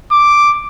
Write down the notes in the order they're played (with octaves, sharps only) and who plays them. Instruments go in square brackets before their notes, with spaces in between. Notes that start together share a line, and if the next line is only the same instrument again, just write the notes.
[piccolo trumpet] D6